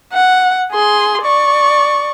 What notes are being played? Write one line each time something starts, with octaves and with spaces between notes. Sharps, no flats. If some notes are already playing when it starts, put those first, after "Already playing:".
F#5
G#4 C6
D5 C#6